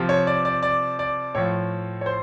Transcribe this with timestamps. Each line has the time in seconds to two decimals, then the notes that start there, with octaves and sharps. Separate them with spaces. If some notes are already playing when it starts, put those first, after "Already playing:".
Already playing: C3 F3
0.09 C#5
0.27 D5
0.45 D5
0.63 D5
0.99 D5
1.35 A2 F3 C#5
2.01 C#5
2.06 C5